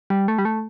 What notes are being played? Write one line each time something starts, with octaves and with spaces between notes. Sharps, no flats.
G3
A3
G3
A3